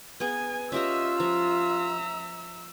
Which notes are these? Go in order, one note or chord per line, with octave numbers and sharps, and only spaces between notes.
B3 G#4 G#5
C#4 F4 G4 D#5 E5 A#5 E6
F3 E5 A#5